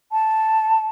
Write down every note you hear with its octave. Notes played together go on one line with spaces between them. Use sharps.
A5